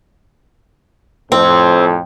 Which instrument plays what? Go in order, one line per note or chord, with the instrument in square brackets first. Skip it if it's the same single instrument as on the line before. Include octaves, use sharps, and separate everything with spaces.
[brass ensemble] F2 A2 [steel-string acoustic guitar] C4